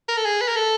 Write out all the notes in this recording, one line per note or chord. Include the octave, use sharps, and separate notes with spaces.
A#4
A4
G#4
B4
A#4
A4